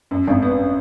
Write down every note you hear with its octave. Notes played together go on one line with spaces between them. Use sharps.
F#2
G#1
B3